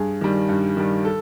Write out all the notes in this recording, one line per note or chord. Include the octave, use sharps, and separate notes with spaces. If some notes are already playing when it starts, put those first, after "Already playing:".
Already playing: G2 G#4
D#3 G3
G2
D#3 G3
A4